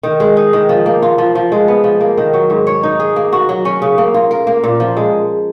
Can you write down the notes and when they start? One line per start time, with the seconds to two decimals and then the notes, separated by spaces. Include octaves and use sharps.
0.03 D#3
0.20 G#3
0.37 D#4
0.53 D#3
0.69 F3
0.86 A#3
1.02 F4
1.18 F3
1.35 F3
1.52 G#3
1.68 B3
1.84 F3
2.01 A#3
2.18 D#3
2.34 F#3
2.50 G#2
2.67 C#5
2.83 D#4
3.00 G#4
3.16 A#3
3.32 F#4
3.49 F#3
3.65 C#4
3.82 C#3
3.98 A#3
4.14 F4
4.31 A#4
4.47 A#3
4.64 A#2
4.80 F3
4.97 G#3